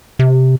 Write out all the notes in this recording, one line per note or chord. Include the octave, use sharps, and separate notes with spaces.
C3